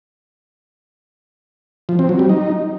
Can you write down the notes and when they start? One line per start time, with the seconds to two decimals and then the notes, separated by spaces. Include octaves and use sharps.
1.89 F3
1.99 C4
2.09 F#3
2.19 G3
2.29 D#4